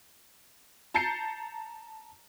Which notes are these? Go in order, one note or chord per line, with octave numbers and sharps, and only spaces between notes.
A5 A#5 G6 A6 C7 C#7